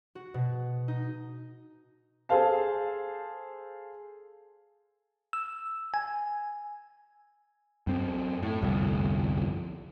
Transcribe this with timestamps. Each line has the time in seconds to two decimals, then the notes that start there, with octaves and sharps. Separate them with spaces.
0.15 F#4
0.34 B2
0.88 D#4
2.29 G#4 A4 C5 F5 A5
5.33 E6
5.94 G#5
7.87 F#2 C4
8.43 A2
8.62 G1 C2 F2